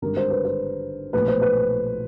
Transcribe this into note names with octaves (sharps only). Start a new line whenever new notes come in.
G#1 G2 D3 A#4
C5
B4
C5
B1 A#2 F3 A3 B4
C5
B4